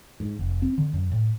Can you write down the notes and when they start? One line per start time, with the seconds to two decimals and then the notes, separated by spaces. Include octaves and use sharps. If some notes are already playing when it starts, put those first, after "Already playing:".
0.20 G#2
0.39 F1
0.62 C4
0.78 D3
0.93 F#2
1.12 A2